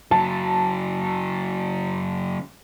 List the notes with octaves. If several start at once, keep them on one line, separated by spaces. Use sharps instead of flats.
C#3 F#3 A5